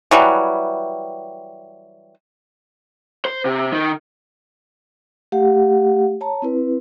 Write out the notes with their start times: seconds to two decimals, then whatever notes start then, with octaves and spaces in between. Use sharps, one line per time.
0.11 E3 F#3 G3
3.25 C5
3.45 C3
3.72 D#3
5.32 A3 G4 F5 F#5
6.21 C#5 A5 A#5
6.42 C4 E4 B4